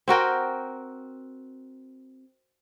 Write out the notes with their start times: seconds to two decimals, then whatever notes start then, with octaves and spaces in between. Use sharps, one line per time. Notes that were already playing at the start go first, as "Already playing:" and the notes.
0.08 C4 F#4 A#4 G5